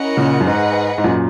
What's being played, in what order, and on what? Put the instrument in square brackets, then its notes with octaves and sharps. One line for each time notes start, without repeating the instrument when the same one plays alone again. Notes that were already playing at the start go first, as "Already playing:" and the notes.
Already playing: [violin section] C#4 E4 A#4 D#5 F#5
[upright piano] A#2 C#3
F#2
[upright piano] G#2 [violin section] G#4 B4 D#5 F#5
[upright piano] G#2
F#2 A#2